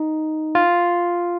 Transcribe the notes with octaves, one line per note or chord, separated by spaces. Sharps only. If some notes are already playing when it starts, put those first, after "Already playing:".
Already playing: D#4
F4